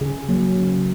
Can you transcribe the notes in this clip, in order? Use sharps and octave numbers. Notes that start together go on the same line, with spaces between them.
C#3 G#4
F#3 A#3
C#3